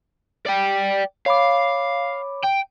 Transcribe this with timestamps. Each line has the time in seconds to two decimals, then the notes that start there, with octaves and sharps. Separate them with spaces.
0.46 D5 G5
1.26 C#5 F5 B5 D6
2.43 G5